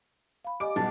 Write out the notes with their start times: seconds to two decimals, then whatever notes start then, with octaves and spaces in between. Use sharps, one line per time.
0.45 F5 B5
0.60 G4 D5 D#5 G#5 D6 D7
0.76 B1 B2 G3 A5 A6